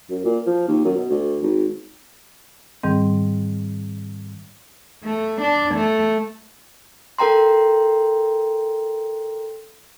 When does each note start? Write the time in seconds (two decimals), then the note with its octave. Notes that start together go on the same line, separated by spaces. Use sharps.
0.10 F#2
0.25 A#2
0.46 F3
0.68 D#2
0.84 F#2
0.97 B2
1.10 D2
1.42 G#1
2.83 G#2 D#3 G3 C4
5.05 A3
5.42 D4
5.76 A3
7.19 A4 A#4 G5 A#5 C6